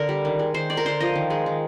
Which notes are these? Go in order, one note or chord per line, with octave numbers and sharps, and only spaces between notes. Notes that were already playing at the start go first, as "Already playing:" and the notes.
Already playing: D3 A#4
G3
D#3
G#3
D#3 C5
G#3 D5
A#4
D3 C5
F3 D#5
D#3
G#3
D#3